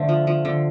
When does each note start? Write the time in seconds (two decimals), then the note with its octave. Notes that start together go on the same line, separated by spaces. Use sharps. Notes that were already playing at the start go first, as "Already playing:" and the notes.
Already playing: D3 A3 C5
0.09 F3
0.27 F3
0.45 D3